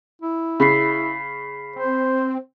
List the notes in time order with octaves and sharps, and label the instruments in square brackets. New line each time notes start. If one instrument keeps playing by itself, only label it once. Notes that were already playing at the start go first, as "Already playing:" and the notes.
[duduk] E4
[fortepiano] C#3 [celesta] B5 B6 C7
[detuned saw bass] C4 [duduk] C5